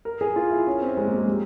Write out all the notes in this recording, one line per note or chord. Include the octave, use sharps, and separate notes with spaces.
A#4
G#4
F4
E4
C#4
C4
G#3
A#3
G#3
G3